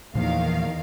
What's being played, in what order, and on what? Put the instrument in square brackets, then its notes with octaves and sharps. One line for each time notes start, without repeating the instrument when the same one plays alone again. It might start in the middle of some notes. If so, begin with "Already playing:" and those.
[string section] E2 D#3 F5 [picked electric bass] A#2 F3 A#3